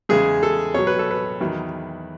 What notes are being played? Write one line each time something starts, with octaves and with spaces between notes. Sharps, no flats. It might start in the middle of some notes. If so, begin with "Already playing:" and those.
E2 C#3 G#3 G#4
A4
B2 F#3 C#5
B4
A4
B4
E2 D#3 F#3